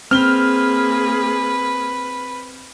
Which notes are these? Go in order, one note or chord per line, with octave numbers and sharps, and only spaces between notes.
A#3 C4 G#4 B4 F6 G7